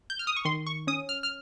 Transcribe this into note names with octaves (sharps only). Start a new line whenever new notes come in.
G6
F6
D#6
C#6
D#3 C6
C#6
C#4 D#6
F6
F6